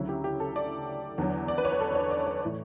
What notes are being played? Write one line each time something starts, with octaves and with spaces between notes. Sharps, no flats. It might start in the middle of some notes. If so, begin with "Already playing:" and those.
Already playing: D2 C#3 F#3 E4
G4
G4
A4
D5
E2 D3 F#3
D5
B4
C#5
B4
A4
C#5
D5
C#5
A2 E3 C#5